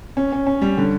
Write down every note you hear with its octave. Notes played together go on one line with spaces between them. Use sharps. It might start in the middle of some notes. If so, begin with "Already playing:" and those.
C#4
C#4
C#4
G3
D3